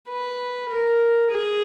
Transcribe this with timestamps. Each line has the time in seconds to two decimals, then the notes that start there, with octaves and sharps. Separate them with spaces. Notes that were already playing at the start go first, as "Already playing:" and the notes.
0.09 B4
0.70 A#4
1.32 G#4